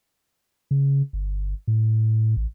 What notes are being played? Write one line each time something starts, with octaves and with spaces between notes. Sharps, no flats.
C#3
G1
A2
A1